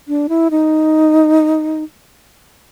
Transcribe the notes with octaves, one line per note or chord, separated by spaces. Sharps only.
D4
E4
D#4